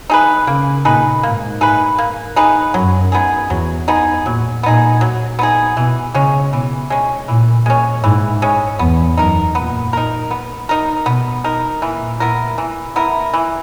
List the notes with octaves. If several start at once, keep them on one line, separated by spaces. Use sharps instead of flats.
D#4 G#4 B4
C#3 A#3
A#2 D#4 G#4 B4
G#2 A#3
D#4 G#4 B4
A#3
D#4 G#4 B4
F#2 F#3
B3 D#4 G#4
E2 F#3
B3 D#4 G#4
A#2 F#3
A#2 B3 D#4 G#4
F#3
B3 D#4 G#4
B2 E3
C#3 G#3 C#4
B2 E3
G#3 C#4
A#2 E3
A#2 G#3 C#4
G#2 E3
G#3 C#4
E2 B3
F#2 D#4 A#4
A#2 B3
D#4 A#4
B3
D#4 A#4
B2 B3
D#4 A#4
A#2 E3
B3 E4 A#4
E3
B3 E4 A#4
E3